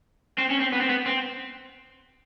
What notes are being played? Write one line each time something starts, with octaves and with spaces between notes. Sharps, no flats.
C4
C#4
C4
B3
C4
B3
C4